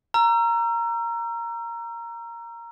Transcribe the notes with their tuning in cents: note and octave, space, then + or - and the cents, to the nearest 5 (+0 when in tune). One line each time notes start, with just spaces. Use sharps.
A#5 +0 E6 +40